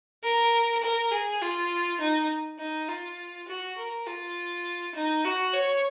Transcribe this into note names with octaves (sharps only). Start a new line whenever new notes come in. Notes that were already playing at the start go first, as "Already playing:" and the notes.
A#4
A#4
G#4
F4
D#4
D#4
F4
F#4
A#4
F4
D#4
F#4
C#5